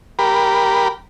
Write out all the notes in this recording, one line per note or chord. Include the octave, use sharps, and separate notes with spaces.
G4 A#4 B5